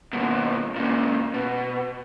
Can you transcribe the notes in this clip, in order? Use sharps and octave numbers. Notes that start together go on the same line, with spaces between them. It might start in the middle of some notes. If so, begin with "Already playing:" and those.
D#2 B2
A#2 C#3
B2